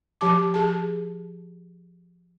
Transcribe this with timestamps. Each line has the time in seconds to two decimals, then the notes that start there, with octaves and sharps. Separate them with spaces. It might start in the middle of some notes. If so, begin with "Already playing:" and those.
0.21 F3 G4 A5 D6
0.54 G#4 A5